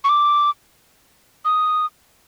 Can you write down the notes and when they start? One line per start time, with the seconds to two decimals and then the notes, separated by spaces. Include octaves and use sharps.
0.04 C#6
0.09 D6
1.45 D#6